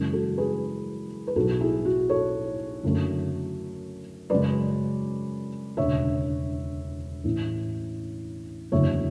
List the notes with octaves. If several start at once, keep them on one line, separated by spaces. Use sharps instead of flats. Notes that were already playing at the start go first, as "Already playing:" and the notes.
Already playing: F#2 C#3 E3 G#3
F#4 A4
G#4 B4
B4
B1 A2 F#3 F#4 A4
E4 G#4
F#4
A4 C#5
F#1 F#2 D3 A3
F#2 C#3 G#3 B4 D5
E1 D2 C#3 C#5 E5
A1 A2 E3
F#1 E2 D3 F#3 A3 C#5 E5